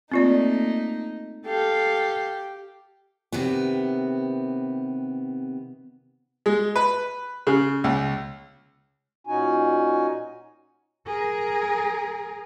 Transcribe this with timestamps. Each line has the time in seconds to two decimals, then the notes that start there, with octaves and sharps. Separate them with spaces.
0.12 A3 A#3 C4 D#4 F4 D5
1.46 G4 A4 F5
3.32 C3 D#3 B3
6.46 G#3
6.76 B4
7.47 C#3
7.84 C#2
9.27 A#2 C#4 D#4 F#4 G#5
11.07 G#4 A#4